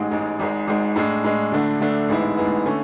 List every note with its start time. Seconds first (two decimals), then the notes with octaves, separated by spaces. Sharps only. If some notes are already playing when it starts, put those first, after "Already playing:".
Already playing: A1 G#2 G#3
0.11 A1 G#2 G#3
0.39 G#1 G#2 G#3
0.68 G#1 G#2 G#3
0.96 A2 G#3 D4
1.24 A2 G#3 D4
1.52 D2 D3 A3 D4
1.80 D2 D3 A3 D4
2.08 A1 G#2 G#3 B3 E4
2.37 A1 G#2 G#3 B3 E4
2.65 D3 A3 C#4